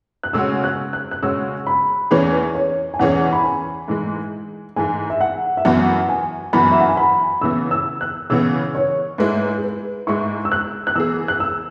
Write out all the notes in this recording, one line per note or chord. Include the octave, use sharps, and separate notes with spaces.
F#6
C#3 G#3 C#4 F#4 E6
F#6
F#6
F#6
C#3 G#3 C#4 F#4 E6
B5
E2 E3 C#4 G#4 B4
C#5
G#5
E2 E3 C#4 G#4 F#5
B5
G#5
G#2 E3 G#3
G#2 E3 G#3 G#5
E5
F#5
E5
F#2 E3 B3 F#4 F#5
G#5
F#2 E3 B3 F#4 B5
E5
F#5
G#5
B5
C#3 E3 B3 E6
E6
F#6
C#3 E3 B3 E6
C#5
G#2 G#3 E4 B4
G#4
B4
G#2 G#3 E4 C#6
E6
F#6
F#6
E3 B3 G#4 E6
F#6
E6